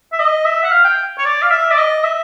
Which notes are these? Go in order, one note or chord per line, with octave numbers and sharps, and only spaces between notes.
E5
D#5
E5
F#5
F5
G5
C#5
D5
F5
E5
D5
D#5
E5